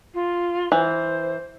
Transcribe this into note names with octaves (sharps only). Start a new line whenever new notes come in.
F4
E3 C5